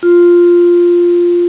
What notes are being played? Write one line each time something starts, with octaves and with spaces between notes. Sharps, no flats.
F4